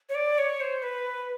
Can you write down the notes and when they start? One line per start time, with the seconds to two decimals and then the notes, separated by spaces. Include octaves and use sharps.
0.09 C#5
0.15 D5
0.38 C#5
0.61 C5
0.82 B4